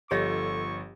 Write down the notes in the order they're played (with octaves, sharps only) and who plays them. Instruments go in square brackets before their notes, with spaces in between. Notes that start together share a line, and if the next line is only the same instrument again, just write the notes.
[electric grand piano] G1 F3 A#6 [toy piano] G4 C#5 D#5 [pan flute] A4 [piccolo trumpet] C#6